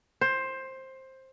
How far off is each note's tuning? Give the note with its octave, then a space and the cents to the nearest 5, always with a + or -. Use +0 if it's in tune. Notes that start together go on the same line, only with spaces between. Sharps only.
C5 +15